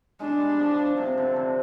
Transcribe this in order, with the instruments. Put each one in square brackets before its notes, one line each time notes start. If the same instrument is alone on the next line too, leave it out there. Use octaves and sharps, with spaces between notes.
[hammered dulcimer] G#3 [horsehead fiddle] D4
[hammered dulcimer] G3
F3
[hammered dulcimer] C3 [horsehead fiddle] C4
[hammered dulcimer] D3
C3